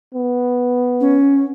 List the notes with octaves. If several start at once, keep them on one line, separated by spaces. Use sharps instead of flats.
B3
C#4